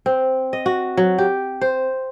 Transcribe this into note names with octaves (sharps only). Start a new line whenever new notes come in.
C4
D#5
F#4
F#3
G4
C5